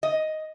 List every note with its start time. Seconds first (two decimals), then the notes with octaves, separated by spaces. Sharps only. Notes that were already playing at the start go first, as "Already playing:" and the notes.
0.03 D#5